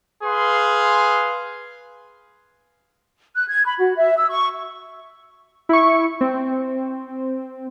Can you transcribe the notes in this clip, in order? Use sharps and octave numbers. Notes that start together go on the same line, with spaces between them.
G#4 B4 F5 C6
F#6
G#6
B5
F#4
E5
E6
C#6
E4 C#6
C4